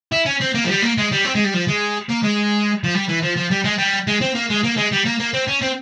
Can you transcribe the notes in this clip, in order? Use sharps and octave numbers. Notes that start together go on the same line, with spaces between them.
E4
C#4
C4
A#3
F3
G3
A#3
G#3
G3
C4
G#3
G3
F3
G#3
A#3
G#3
F3
G3
E3
F3
F3
G3
G#3
G3
G#3
C4
A#3
G#3
A#3
G#3
G3
A#3
A#3
C4
C#4
C4